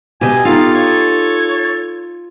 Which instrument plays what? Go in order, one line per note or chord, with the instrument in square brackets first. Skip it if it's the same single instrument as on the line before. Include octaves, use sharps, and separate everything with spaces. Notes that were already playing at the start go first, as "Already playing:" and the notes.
[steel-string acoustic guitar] B2 [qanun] G4 D#5 E5 [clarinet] G#5
[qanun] D#4 [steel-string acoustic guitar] F4 [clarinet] A4 [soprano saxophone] F5
[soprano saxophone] C#5